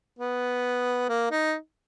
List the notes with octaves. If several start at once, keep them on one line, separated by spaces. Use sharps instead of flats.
B3
A#3
D#4